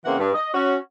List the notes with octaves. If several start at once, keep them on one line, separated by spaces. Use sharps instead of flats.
C#3 E3 A#3 C4 F#5
G2
D#5
C#4 F#4